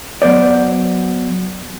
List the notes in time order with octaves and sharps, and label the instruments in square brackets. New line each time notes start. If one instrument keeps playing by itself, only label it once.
[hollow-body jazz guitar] F#3 B3 C5 D5